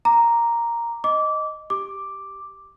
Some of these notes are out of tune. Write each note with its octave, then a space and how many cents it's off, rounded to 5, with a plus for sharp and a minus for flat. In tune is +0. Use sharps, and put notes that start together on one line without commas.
A#5 +0 D6 +0
D#5 +0 D6 -20
G4 +0 D6 +0